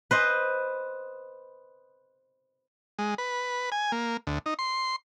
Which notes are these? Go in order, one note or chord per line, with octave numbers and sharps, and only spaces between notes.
B4 C5 D#5
G#3
B4
G#5
A#3
D2
D#4
C6